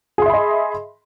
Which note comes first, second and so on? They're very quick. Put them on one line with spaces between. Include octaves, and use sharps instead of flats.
G#4 C6 E5 B5 D#5